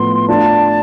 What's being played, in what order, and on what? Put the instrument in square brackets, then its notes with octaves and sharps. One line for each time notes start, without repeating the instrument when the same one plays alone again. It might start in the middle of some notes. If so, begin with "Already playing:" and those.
Already playing: [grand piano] A2 F3 B3 [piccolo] C6
[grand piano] A3 D4 F4 [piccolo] A5